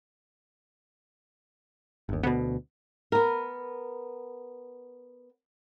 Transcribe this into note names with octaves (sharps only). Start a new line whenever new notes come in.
G1 D#2
D2 B2 B3
B3 A#4